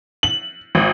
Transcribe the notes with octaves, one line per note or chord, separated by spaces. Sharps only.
F#7
G#1